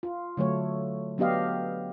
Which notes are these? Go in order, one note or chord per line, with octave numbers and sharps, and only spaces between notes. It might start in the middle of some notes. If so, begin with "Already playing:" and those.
F4
D3 F#3 A3 C#5
F#3 B3 D4 G4 D#5 F5